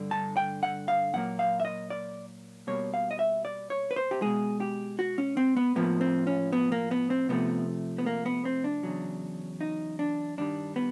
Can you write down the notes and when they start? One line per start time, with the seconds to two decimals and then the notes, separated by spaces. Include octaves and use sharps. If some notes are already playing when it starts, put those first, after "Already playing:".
Already playing: G2 D3 G3
0.11 A5
0.37 G5
0.63 F#5
0.88 F5
1.14 A#2 F#3 A#3 F#5
1.39 F5
1.60 E5
1.65 D#5
1.90 D5
2.67 B2 G3 A#3 C#5
2.94 F5
3.11 D#5
3.19 E5
3.45 D5
3.70 C#5
3.91 B4
3.96 C5
4.11 G4
4.22 B2 G#3 G#4
4.60 G4
4.99 F#4
5.18 C#4
5.37 C4
5.57 B3
5.76 A2 F3 A#3 B3
6.01 C4
6.27 C#4
6.53 B3
6.72 A#3
6.91 B3
7.10 C4
7.29 C3 F3 A3 B3
7.98 B3
8.06 A#3
8.26 B3
8.45 C4
8.64 D4
8.83 E2 C#3 F#3
9.61 D#4
9.99 D4
10.38 G2 D#3 G3 D4
10.76 B3